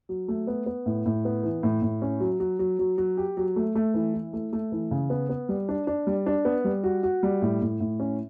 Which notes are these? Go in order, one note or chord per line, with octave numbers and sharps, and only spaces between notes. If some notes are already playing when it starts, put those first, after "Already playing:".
F#3
A3
B3
B3
A2
A2
B3
E3
A2
A2
C#4
F#3
F#3
F#3
F#3
F#3
G4
F#3
A3
A3
E3
E4
A3
A3
E3
C#3
B3
B3
G3
D4
D4
G3
D4
B3
G3
F#4
F#4
G3
A2
A2
A2
C#4